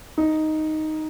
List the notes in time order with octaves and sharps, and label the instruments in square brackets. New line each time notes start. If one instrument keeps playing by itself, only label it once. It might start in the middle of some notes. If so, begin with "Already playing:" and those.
[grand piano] D#4